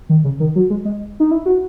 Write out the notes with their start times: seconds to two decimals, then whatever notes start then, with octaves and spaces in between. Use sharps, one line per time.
0.09 D#3
0.24 C#3
0.40 D#3
0.56 F#3
0.70 G#3
0.85 G#3
1.20 D#4
1.31 E4
1.46 F#4